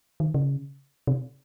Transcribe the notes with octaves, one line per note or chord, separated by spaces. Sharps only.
D#3
C#3
C3